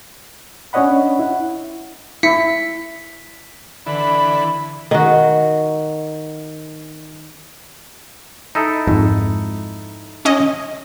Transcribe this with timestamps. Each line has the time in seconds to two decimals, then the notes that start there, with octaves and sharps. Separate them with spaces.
0.73 C#4 D4 C#5 D#5 F#5 B5
1.19 E4 F#5
2.23 E4 B6 C#7
3.86 D3 E3 B5
4.91 D#3 F#4
8.55 D#4 E4 A4
8.87 F2 G#2
10.25 C#4 D#5